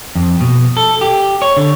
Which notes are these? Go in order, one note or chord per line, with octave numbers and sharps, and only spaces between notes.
F2
B2
A4
G4
C#5
D3